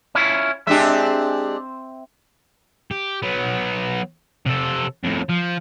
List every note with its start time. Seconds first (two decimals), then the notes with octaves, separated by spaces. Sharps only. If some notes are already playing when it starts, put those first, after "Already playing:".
0.15 C#4 E4 F4
0.67 G#3 C4 D4 G4 E5
2.91 G4
3.22 F#3 B3
4.46 C3 A4
5.04 F2 A2
5.30 F3